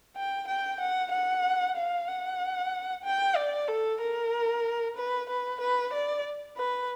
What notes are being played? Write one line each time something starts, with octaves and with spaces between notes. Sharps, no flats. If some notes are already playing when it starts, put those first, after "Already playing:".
G5
G5
F#5
F#5
F5
F#5
G5
D5
A4
A#4
B4
B4
B4
D5
B4